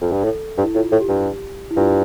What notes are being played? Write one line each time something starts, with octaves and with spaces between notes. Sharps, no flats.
F2
G2
A2 A4
G2
E4
A2 F4
A2
G4
G2
E4
G2 F4